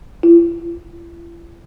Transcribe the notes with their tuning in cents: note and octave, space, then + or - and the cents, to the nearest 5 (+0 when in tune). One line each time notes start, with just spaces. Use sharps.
E4 +45